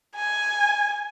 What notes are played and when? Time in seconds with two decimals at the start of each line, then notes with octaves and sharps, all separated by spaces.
0.16 G#5